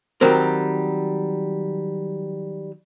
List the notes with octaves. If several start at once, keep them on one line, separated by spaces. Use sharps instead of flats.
D#3 F#3 G3 C4 A#4